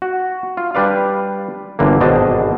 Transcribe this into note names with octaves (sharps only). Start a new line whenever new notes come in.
F#4
F4
G3 D4 B4 D5 F5
G1 D3 E3 A#3
G#1 B2 D4 C5 D#5 A5